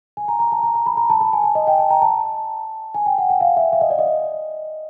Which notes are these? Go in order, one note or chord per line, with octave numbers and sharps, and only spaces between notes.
G#5
A#5
A#5
A5
A#5
A#5
B5
A#5
A5
A5
G#5
A5
D#5
G5
A5
A#5
A5
G#5
G5
F#5
F#5
F5
E5
E5
D#5
D5
D#5